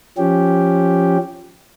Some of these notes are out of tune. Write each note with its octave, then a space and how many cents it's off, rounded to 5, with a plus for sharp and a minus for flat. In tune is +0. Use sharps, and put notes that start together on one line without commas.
F3 +0 C#4 +5 G4 +0